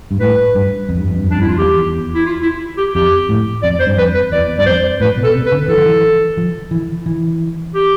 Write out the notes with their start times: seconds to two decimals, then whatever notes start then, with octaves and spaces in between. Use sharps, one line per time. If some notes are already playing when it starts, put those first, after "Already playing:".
0.11 G2
0.20 A2 B4
0.55 G2
0.89 F2
0.98 G2
1.08 F2
1.17 G2
1.26 F2 D4
1.36 G2
1.40 E4
1.45 F2
1.48 F4
1.57 E2 G4
2.14 E4
2.26 F4
2.42 E4
2.77 G4
2.94 F2 G4
3.29 A2
3.63 F2 D5
3.80 C5
3.86 G2
3.97 F2 B4
4.15 B4
4.32 E2 D5
4.58 G2 D5
4.66 F2 C5
5.00 A2 B4
5.17 B2
5.23 A4
5.35 C3
5.46 B4
5.52 D3
5.68 E3 A4
5.77 F3
5.86 E3
6.37 F3
6.71 E3
7.06 E3
7.74 G4